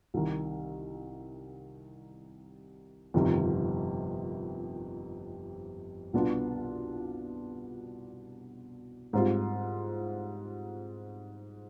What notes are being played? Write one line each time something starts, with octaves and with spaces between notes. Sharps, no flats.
C2 C3 D#3
G1 F2 C3 D#3
C2 B2 B3 D4 F4
G#2 G3 C4 F4